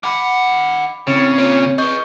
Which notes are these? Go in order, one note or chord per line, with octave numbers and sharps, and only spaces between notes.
D#3 F#5 B5 D6
A2 C#3 C4
A#3 F4 C#5
G#4 B4 D#5 C#6 G6